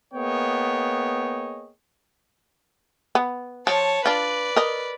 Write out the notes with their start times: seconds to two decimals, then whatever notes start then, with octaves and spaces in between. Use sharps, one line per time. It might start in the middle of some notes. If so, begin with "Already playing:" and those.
0.14 A#3 B3 G#4 C#5 D#5 G5
3.15 B3
3.67 F3 C#5 A5
4.06 D4 F4 B4 D5
4.56 A#4 D#5